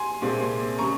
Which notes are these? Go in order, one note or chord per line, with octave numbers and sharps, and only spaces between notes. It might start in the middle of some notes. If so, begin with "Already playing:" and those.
Already playing: G#5 C6
C2 A#2 G#3 C4
C#3 G3 A#5 C#6